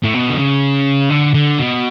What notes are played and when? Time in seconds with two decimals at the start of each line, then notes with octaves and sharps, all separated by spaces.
0.03 A2
0.14 B2
0.29 D3
0.38 C#3
1.10 D3
1.35 D3
1.59 B2